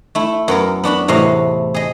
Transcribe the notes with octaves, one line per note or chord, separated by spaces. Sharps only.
A3 E4
F#2 B3 A#4
B3 D4 F#4 B5
E2 A2 C3 F#4 D#5 F5
G#4 D#5